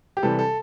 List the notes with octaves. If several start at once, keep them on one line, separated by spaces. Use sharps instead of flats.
G4
C3 E3 G3 A4
A4